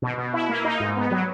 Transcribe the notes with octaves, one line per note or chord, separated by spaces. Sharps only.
B2
B2
E4
A#3
D#4
G#2
B3
F#3